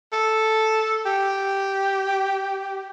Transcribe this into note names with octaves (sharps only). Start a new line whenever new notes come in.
A4
G4